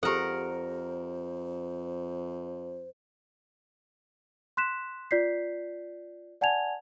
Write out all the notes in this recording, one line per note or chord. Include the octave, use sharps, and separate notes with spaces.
F2 G4 A4 A#4 C5 F#5
C6 F#6 B6 E7
F4 D5 G6 B6 C7
D5 F#5 G#5 A5 G#6 F7